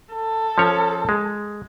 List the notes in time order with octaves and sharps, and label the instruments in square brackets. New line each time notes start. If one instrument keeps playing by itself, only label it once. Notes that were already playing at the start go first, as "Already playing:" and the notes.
[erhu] A4
[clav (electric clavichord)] F3 C#4 C#5
G#3